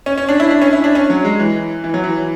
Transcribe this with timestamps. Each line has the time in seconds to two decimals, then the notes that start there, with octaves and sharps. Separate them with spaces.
0.06 C#4
0.18 C#4
0.29 D4
0.40 E4
0.51 D4
0.62 C#4
0.73 E4
0.84 D4
0.95 C#4
1.10 F#3
1.25 G#3
1.39 E3
1.84 E3
1.94 F#3
2.04 E3